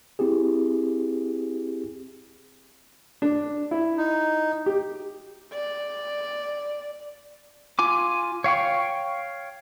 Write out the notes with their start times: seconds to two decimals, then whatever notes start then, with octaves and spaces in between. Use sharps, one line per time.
0.19 C4 E4 G4 G#4
3.22 D4
3.71 E4
3.97 D#4
4.66 G4
5.53 D5
7.79 F4 G#5 D6
8.44 C#5 F5 G5 C#6